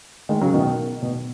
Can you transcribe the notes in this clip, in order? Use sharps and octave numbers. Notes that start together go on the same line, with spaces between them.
D#3 G#3
C#3 F#3
B2 D#3
B2